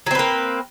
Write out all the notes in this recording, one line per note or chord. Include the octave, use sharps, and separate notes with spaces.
F#3 A#3 C4 B4